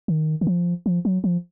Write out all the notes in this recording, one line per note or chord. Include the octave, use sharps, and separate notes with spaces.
D#3
D#3
F3
F3
F#3
F3